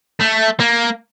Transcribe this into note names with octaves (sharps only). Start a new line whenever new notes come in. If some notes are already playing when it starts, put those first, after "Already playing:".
A3
A#3